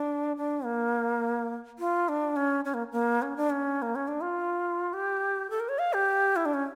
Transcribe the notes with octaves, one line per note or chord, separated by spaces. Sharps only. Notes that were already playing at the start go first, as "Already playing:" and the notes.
Already playing: D4
D4
A#3
F4
D4
C#4
C#4
A#3
A#3
C#4
D4
C#4
A#3
C#4
D4
F4
G4
A4
A#4
C#5
F5
G4
E4
D4
C#4